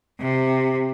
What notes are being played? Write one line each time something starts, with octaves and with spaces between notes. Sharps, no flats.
C3